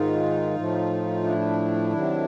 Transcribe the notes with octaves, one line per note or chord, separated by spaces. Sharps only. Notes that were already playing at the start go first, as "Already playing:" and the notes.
Already playing: G#2 D#3 G#3 D#4 F4
A2 F3 A3
D4 E4
C3 D#3 F#3